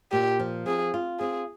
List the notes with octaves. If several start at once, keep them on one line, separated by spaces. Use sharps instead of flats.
A#2 G4
F3
C4 G#4
F4
C4 G#4